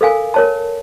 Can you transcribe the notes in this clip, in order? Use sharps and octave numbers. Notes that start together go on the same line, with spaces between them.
A4 A#4 F5 G#5
A#4 C#5 A5